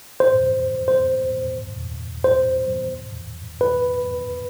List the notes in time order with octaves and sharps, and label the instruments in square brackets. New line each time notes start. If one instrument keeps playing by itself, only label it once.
[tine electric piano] C5
C5
C5
B4